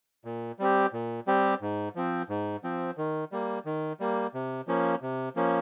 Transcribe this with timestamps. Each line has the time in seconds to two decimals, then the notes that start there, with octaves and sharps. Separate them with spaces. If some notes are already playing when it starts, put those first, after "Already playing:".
0.25 A#2
0.59 G3 C4 G4
0.93 A#2
1.27 G3 C4 G4
1.62 G#2
1.95 F3 C4
2.29 G#2
2.64 F3 C4
2.97 D#3
3.32 G3 A#3
3.66 D#3
4.00 G3 A#3
4.34 C3
4.67 F3 A#3 C#4
5.02 C3
5.36 F3 A#3 C#4